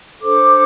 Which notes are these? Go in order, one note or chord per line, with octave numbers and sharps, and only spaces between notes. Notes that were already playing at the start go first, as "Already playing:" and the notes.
D4 A4 C5 D6